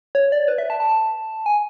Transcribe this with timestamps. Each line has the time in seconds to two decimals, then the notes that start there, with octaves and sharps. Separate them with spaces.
0.15 C#5
0.32 D5
0.48 B4
0.58 E5
0.70 A5
0.80 A5
1.46 G#5